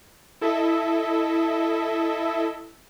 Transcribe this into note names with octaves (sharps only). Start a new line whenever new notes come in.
E4 A4 D#5 E5